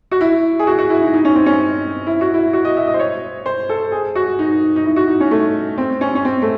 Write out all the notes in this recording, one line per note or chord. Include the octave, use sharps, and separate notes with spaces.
F#4
E4
G#4
F#4
F#4
E4
D#4
D#4
C#4
C4
C#4
E4
F#4
E4
F#4
D#5
E5
D#5
C5
C#5
C5
A4
G#4
F#4
D#4
D#4
E4
F#4
D#4
C#4
A3
C4
C#4
C#4
C4
A3